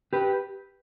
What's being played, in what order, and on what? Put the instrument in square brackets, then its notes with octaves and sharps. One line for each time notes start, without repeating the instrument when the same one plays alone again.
[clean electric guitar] G4 B4